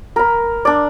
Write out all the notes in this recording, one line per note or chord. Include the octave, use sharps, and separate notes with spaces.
A#4 B5
D4 D5